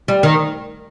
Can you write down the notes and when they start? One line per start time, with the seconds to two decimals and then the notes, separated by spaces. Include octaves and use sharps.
0.08 G3
0.23 D#3